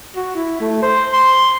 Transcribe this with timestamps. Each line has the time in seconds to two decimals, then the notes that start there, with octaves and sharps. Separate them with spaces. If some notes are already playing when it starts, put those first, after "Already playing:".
0.16 F#4
0.35 E4
0.61 A3
0.83 C5
1.13 C6